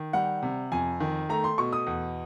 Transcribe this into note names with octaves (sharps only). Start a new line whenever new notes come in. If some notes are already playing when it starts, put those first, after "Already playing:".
Already playing: D#3
G3 F#5
C3
F2 G#5
D#3
A3 A#5
C6
B2 C#6
D#6
E2